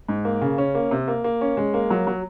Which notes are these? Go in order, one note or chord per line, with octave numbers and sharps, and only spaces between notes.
G#2
A#3
C#3
C#4
A#3
C3
A#3
A#3
C#4
G#3
A#3
F#3
F#3